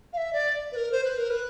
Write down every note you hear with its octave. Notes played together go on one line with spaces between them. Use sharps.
F5
E5
D5
B4
A#4
C5
B4
A#4
B4